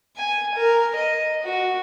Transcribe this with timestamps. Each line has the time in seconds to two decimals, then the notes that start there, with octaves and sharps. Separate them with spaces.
0.16 G#5
0.55 A#4
0.96 D#5
1.43 F#4